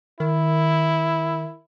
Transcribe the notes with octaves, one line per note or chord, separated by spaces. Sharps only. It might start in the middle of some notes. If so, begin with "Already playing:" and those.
D#3 E4